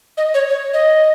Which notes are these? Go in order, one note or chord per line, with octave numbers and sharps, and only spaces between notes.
D#5
C#5
C#5
D#5